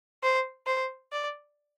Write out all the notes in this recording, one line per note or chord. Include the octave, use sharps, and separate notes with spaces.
C5
C5
D5